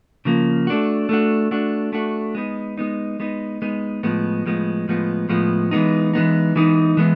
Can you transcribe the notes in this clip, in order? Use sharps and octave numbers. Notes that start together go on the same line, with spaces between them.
C#3 F3 A#3
A3 D4 F#4
A3 D4 F#4
A3 D4 F#4
A3 D4 F#4
G#3 B3 D#4
G#3 B3 D#4
G#3 B3 D#4
G#3 B3 D#4
A2 F3 G#3 B3
A2 F3 G#3 B3
A2 F3 G#3 B3
A2 F3 G#3 B3
E3 G#3 B3 D#4
E3 G#3 B3 D#4
E3 G#3 B3 D#4
E3 G#3 B3